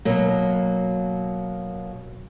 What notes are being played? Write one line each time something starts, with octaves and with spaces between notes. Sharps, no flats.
B2 F#3 A#3